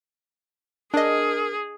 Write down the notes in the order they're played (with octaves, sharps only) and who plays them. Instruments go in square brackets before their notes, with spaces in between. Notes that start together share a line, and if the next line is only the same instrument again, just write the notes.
[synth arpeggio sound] D4 D#5 [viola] G#4 [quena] A#4